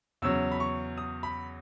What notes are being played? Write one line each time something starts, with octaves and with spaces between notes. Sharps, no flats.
E2 C#3 F#3 C#4 E6
B5
C#6
D#6
B5